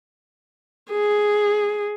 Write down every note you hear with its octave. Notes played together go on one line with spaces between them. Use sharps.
G#4